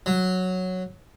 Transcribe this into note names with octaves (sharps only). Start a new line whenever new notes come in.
F#3